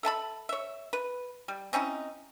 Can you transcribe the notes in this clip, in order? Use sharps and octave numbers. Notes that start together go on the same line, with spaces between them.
A4 E5 A5 B5
C#5 E5
B4
G3
C4 C#4 D#4 E4